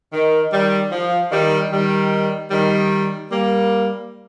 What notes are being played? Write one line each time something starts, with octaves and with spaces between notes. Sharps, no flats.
D#3
D#3 G3
F3
D#3 G3
D#3 G3
D#3 G3
G3 A#3